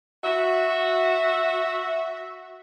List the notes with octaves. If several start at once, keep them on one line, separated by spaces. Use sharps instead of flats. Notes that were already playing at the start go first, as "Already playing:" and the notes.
F#4 E5